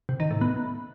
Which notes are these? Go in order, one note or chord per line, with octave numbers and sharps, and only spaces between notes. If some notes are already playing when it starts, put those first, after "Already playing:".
C3
D#3
A2
B3